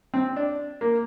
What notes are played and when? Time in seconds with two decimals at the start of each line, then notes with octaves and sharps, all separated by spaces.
0.14 C4
0.36 D4
0.81 A#3